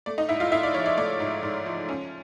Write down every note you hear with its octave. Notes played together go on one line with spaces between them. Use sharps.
A3 D5
D#4 D#5
G#2 E4 E5
F4 F5
G#2 E4 E5
D5
F3 C#5
D5
A3 D5
G#2
G#2
F3
C#4